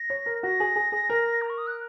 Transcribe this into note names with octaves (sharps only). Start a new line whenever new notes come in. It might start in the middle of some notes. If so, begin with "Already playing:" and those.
Already playing: A#6
C#5
A#4
F#4 A#6
G#4
G#4
G#4
A#4
A#5
C#6
D#6
F#6